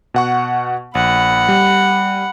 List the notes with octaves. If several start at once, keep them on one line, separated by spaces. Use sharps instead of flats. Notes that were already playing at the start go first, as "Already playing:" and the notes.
B2 F#5 C#6
A#1 F#5 B5
G3